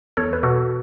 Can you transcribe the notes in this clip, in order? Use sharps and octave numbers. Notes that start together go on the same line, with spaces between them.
E2 A4 C#5
B4
B2 F#4 A4